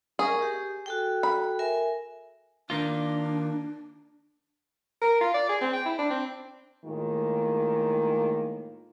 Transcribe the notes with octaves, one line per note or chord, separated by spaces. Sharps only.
G#4 A#4 C#6
G4
F#4 A4 G5
B5
A#4 E5 G#5
D#3 A#3 D4 F4
A#4
F4
D5
G#4
C4
G5
E4
D4
C4
A2 D#3 G#3 A#3 F4